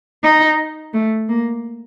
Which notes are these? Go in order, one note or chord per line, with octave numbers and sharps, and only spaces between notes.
D#4
A3
A#3